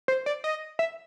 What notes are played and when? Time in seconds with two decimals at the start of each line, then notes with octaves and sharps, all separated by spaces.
0.08 C5
0.26 D5
0.44 D#5
0.79 E5